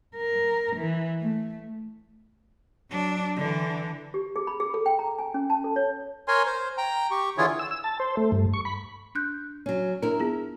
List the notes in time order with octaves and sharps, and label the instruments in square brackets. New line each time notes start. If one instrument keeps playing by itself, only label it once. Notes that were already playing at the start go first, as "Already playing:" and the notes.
[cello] A#4
E3
A3
F#3 D4
D3 E3
[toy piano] G4
G#4
B5
G#4
A4
G5
A#5
G#5
C#4
A5
A4
C#5
[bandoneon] A#4 C#5 G#5 C6
C5
G5 A#5
G4 C#6
D3 E3 E4 F4 G#4 C#5
[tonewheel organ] E6
E6
A5
C5
A3
G2
C#6
B5
[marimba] D4 F#6 G6
[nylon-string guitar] F#3 C#4
[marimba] D4 [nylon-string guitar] E4 A#4
[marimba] B3 F4 G#4